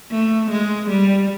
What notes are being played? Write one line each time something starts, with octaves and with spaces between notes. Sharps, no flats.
A3
G#3
G3